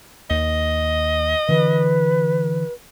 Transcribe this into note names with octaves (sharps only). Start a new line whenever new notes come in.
D#2 D#5
D3 E3 B4